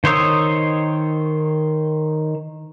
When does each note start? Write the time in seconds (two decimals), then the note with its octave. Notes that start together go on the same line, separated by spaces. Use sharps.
0.04 D#3 C5 C#5 D#6 E6